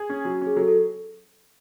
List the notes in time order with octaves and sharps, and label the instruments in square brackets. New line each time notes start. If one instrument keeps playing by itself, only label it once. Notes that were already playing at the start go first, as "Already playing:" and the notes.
Already playing: [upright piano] G#4
C#4
F#3
C#4
[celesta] G#4
[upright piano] F#3 [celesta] A4
[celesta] A4